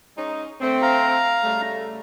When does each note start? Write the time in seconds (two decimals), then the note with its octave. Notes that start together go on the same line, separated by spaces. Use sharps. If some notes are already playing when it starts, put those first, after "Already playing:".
0.17 G#3 C#4 D#4
0.60 D3 A3 C4
0.82 F5 A#5
1.43 C#3 G3 A3